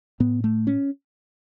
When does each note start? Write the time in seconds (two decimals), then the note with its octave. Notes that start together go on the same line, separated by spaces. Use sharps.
0.20 A2 B3
0.44 A3
0.67 C#4